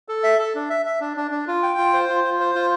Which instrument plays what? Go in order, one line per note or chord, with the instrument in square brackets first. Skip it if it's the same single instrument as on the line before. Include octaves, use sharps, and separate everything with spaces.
[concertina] A4
E5
A4
D4
E5
E5
D4
D4
D4
F4
G5
F4
C5
F4
F4
C5
F4